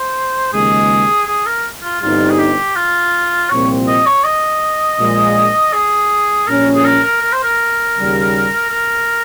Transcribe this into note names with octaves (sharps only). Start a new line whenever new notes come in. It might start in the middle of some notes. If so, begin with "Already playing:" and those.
Already playing: C5
D#2 C#3 F3 G#3 G#4
G#4
A#4
F4
G1 G2 G3 C4 D#4 F4
G#4
G4
F4
C2 A#2 F3 C4 C#5
D#5
C#5
D#5
A#1 A#2 G#3
G#4
A#1 A#2 G3 C#4 A#4
G#4
A#4
A#4
A#4
C5
A#4
D#2 C#3 G3
A#4